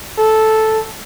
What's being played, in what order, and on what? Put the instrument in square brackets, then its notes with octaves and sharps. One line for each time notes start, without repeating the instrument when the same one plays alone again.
[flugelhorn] A4